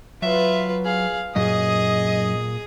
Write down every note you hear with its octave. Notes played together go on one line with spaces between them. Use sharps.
F#3 F4 B4 E5
G#4 F5
F#2 A#2 G#4 D#5 D#6